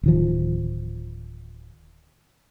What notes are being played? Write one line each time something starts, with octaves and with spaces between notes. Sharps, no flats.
D1 D#3 F3